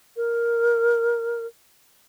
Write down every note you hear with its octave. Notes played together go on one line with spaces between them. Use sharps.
A#4